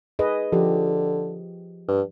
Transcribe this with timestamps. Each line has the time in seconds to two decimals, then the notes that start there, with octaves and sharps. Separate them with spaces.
0.19 G#4 B4 D#5
0.52 D3 F3 G4
1.88 G2